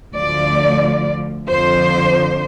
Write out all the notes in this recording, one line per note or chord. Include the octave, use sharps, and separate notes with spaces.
D2 D3 F3 D5
F2 D3 F3 C5